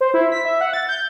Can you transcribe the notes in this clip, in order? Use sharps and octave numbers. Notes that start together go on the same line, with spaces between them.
C5
E4
B6
E5
F#5
A6
G6